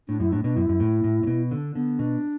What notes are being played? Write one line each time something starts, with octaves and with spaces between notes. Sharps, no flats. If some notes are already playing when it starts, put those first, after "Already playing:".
A2 D4
F#2 E4
A2 D4
B2 D4
F#2 E4
F#2
A2
A2
A2
B2
D3 D4
D3 B3
B2 D4